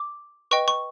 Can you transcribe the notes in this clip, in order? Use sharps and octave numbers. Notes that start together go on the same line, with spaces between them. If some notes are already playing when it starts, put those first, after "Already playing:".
Already playing: D6
B4 D#5 G5 C#6
C#6